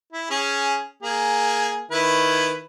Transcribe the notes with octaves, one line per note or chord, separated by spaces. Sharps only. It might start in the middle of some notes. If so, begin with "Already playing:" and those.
E4
C#4 G#4
A#3 G#4
D#3 E4 B4